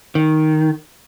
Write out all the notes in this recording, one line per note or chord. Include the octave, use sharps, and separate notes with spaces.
D#3